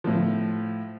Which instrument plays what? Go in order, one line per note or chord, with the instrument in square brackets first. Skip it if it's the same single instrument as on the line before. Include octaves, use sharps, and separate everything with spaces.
[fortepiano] A2 F3